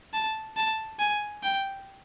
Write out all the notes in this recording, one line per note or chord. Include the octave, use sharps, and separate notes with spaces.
A5
A5
G#5
G5